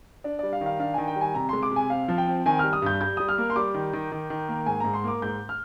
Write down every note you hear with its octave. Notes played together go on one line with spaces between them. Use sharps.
D4 D5
G3 D5
F5
D#3
F5
D4 F5
D#3 G#5
G5
G3
G#5
C3 A#5
G#3 C6
D6
C3 G#5
C4 F5
F3
G5
C4
D#3 G#5
G3 F6
D#6
G2 G6
G3 G6
G3 D#6
F6
A#3
C6
G3 D6
D#3
D#3
D#3
D#3
A#3
G#2 G#5
G#2 A#5
C6
A#3 D6
G#2 G6
F6